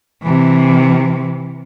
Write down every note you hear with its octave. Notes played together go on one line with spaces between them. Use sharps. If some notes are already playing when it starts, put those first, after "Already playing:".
C3 E3